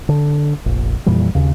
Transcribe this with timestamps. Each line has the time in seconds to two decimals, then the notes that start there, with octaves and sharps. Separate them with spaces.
0.09 D3
0.66 F1 A#1
1.06 F2 A#2 E3 G3
1.35 D#2 C#3